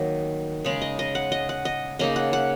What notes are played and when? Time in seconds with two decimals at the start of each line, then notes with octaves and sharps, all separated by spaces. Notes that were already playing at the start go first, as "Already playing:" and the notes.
Already playing: D#3 F#3 A#3
0.65 C#3 G#3 D#4
0.81 D#5
0.99 D#5
1.15 F#5
1.32 D#5
1.49 F#5
1.65 D#5
1.99 C#3 A#3 D#4 D#5
2.16 F#5
2.33 F#5